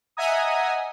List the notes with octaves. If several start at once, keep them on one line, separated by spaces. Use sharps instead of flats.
D#5 E5 F#5 G#5 A#5 D#6